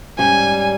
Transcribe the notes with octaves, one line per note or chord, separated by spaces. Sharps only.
G#2 G3 C#4 G#5